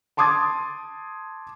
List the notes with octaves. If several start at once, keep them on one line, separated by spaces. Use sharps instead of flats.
A5 C6 D6 D#6 G#6 A6